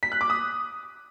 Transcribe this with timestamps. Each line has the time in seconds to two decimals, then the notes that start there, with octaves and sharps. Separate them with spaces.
0.03 B6
0.12 F#6
0.21 D6
0.30 D#6